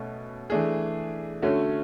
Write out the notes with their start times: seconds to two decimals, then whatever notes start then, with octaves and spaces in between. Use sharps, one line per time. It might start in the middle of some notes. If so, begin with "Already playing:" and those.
Already playing: B2 A3 C#4
0.50 E3 A3 D4 G#4
1.42 D3 A3 C#4 F#4